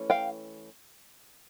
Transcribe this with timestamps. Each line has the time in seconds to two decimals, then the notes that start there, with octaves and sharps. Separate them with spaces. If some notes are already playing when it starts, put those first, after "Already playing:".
Already playing: E3 A3 C#4
0.10 F5 G5